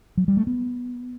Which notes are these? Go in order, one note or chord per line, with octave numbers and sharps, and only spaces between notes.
F#3
G3
A3
B3